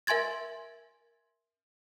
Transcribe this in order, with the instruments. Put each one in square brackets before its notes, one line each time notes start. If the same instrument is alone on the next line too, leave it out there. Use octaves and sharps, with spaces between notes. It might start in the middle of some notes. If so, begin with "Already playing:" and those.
[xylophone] A#4 E5 G#5 C6 G#6 A6